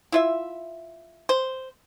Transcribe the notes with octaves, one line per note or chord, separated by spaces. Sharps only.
E4 F4 E5
C5